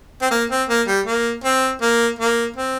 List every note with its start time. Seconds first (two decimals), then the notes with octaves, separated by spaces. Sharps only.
0.22 C4
0.31 A#3
0.50 C4
0.69 A#3
0.87 G3
1.06 A#3
1.44 C4
1.81 A#3
2.19 A#3
2.56 C4